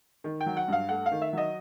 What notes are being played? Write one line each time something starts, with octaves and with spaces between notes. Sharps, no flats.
D#3
G5
F#3
F#5
G2 F5
A3 F#5
F5
D#3
E5
F#3 D#5